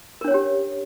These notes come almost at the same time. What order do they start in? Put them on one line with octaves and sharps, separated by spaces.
A#4 D4 C#5 C#4 G4